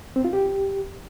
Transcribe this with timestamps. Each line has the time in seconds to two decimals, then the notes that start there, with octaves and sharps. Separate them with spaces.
0.16 C4
0.24 F4
0.33 G4